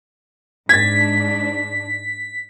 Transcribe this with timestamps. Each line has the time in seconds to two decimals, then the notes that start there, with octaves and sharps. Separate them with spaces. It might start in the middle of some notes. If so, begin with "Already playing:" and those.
0.69 G#2 D4 G#6 A6 B6